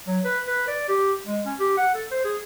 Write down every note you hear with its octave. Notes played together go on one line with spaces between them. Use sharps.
F#3
B4
B4
D5
G4
G#3
C#4
G4
F#5
A4
C5
G#4